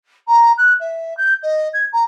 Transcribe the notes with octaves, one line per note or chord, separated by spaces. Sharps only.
A#5
F#6
E5
G6
D#5
G#6
A#5